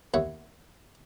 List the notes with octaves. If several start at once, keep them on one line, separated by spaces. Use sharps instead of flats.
D#2 C#5 E5 F#5